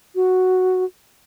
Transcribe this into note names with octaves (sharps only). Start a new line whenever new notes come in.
F#4